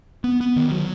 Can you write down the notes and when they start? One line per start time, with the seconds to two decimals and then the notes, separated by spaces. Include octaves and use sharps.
0.24 B3
0.41 B3
0.56 D#3
0.72 F#3